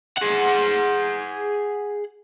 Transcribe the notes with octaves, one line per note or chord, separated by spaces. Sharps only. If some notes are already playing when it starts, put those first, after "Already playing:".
G#4 F#5